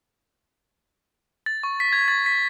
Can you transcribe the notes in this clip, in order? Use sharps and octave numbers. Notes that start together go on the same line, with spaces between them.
A6
C#6
B6
G#6
A6
B6